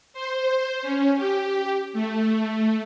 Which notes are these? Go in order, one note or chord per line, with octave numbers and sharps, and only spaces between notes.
C5
C#4
G4
A3